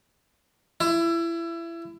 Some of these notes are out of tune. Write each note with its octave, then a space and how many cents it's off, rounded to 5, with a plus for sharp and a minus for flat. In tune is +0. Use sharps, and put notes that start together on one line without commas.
E4 +25